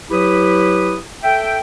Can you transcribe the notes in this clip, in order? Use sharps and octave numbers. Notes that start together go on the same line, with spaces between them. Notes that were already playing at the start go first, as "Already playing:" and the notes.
F#3 E4 G4 B4 D#6
A4 E5 G5